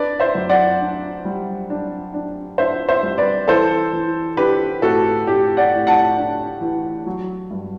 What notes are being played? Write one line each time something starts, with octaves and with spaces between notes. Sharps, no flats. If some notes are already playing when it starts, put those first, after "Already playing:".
Already playing: D4 B4 D5
C5 E5
F#2
D5 F#5
D4
G3
D4
D4
D4 C5 E5
C5 E5
G3
B4 D5
E3 A4 C5
E3
D4 G4 B4
A2 F#4 A4
A2 G4
D5 F#5
A2
F#5 A5
D4
E3
F#3
G2